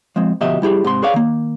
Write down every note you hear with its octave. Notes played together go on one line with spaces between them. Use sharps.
F3 G#3 C4
D2 B2 F3 G4 D#5 E5
G3 E4 G4 G#4
G#2 C3 C6
G#4 B4 C#5 D5 F5
D#3 A#3